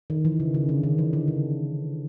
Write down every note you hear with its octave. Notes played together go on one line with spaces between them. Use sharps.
D#3
E3
C#3
C#3
D3
D#3
E3
D3
C#3